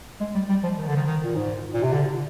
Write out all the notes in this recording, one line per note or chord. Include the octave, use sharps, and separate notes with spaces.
G#3
G3
G3
F3
D#3
D3
D#3
D#3
A#2
G#2
A#2
C3
D3